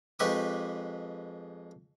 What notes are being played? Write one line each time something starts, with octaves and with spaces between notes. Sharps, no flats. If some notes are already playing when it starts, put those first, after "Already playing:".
F2 G#3 G4 B4 C#6 D6